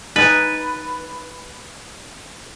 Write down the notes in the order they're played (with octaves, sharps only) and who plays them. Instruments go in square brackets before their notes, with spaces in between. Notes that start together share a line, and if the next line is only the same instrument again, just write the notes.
[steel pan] D#4 D#5 G#5 [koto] B4 [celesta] F#6 A6 F#7